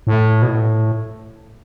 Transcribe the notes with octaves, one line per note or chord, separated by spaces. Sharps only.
A2
B2
A2